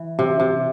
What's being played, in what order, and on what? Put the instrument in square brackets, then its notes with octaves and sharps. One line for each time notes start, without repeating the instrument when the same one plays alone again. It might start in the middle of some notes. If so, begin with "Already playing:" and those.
Already playing: [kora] E3
C3
C3